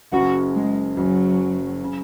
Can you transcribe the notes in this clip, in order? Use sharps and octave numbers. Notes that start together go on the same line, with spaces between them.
F#1 F#2 C#3 F#4
G#3
F#1 F#2 C#3 F#3
C#3